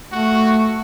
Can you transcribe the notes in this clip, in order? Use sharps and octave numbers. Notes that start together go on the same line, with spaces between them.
A3 F#4